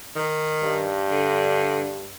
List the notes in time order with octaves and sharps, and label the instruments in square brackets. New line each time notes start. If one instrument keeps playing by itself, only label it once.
[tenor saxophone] D#3
[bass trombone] G2
[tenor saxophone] D3